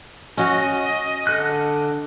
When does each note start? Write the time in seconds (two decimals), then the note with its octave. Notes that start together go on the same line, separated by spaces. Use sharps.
0.37 C#4 F#4 D#5
1.27 D3 A4 F#6